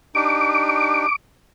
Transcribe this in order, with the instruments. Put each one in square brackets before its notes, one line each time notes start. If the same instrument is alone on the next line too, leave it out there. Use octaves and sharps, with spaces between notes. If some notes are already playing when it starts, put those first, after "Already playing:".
[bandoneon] D4 D#4 G4 [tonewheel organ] D6